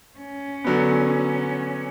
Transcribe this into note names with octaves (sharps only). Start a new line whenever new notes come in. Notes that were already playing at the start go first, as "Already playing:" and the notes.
C#4
D3 F#3 B3